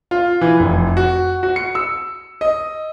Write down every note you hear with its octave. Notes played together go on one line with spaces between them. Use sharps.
F4
E3
F1
F#4
F#4
C#7
E6
D#5